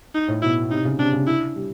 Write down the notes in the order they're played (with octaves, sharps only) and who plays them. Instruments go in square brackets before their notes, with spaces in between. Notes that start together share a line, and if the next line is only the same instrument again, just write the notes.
[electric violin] D#4
[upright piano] A2
[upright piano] B2 [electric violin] E4
[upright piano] C3 [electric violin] D#4
[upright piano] C#3
[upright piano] C3 [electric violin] D4
[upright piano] C#3
[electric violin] E4
[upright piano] G3